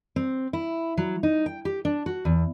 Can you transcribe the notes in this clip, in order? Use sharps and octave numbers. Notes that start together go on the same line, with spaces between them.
C4
E4
F#3
D#4
G5
G4
D4
F#4
E2